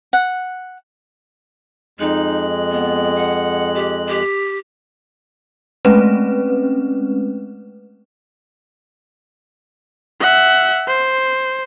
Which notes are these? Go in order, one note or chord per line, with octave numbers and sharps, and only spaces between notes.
F#5
F2 G#3 D#4 F#6
B3
F#5
G4
G4
G#3 A3 C4 C#4 B4
E5 F#5
C5